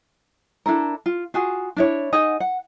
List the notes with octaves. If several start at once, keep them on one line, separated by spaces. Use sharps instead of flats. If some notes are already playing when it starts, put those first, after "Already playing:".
D4 E4 A4 A#4
F4
F4 F#4 G#4
D4 E4 C#5
D#4 G#4 D#5 F#5
F#5